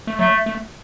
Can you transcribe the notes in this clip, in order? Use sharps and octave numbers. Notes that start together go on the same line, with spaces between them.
A3
F#3 A3
A3